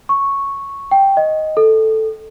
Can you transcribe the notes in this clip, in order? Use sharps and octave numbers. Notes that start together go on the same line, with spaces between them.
C#6
G5
D#5
A4